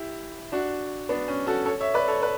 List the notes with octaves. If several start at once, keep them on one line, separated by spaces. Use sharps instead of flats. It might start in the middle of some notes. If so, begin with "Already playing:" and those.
Already playing: E4 G4
D4 F#4
B3 D4
C#4
F#4 A4
A4 C#5
C#5 E5
B4 D5
A4 C#5
B4